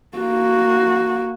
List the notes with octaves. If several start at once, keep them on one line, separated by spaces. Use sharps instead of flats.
A#3 F#4